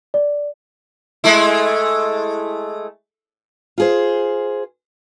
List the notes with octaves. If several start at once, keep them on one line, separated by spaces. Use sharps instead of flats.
D5
G#3 A3 E4
F4 G#4 C5